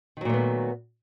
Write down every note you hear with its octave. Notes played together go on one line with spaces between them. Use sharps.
A#2 D#3 F#3 A3 B3